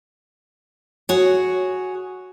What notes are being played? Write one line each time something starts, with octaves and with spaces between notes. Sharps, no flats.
F#4 G#4 C#5